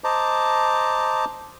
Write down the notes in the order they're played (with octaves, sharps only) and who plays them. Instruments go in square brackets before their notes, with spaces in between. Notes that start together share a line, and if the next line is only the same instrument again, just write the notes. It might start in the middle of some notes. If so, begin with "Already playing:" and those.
[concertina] C5 D#5 A5 A#5 D6